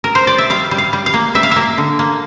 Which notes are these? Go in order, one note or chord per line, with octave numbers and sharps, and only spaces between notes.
A#4
C5
D5
E5
G3 F5
G3
F5
G3
F5
A#3
G3 E5
F5
A#3 E5
D3
A#3